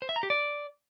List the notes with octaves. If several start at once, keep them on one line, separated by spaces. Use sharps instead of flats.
C5
E5
A#5
G4
D5